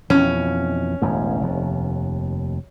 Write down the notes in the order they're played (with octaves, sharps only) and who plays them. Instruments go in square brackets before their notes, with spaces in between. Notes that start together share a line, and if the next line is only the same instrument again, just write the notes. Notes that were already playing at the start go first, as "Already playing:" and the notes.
[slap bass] F2 B2 E3 [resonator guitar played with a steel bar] C#4
[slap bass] E1 A1 F#2
F1 D#2